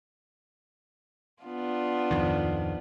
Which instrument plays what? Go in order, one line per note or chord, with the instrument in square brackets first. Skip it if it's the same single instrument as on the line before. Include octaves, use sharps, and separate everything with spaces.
[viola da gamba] B3 D4 F4
[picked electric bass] D1 F2 D#3